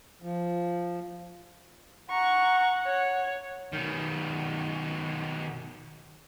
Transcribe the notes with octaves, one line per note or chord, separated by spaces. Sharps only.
F3
F#5 A#5 C#6
C#5
B2 D#3